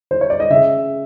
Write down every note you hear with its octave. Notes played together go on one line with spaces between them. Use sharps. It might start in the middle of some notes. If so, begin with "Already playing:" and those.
C5
C#5
D5
D#5
C#3 E5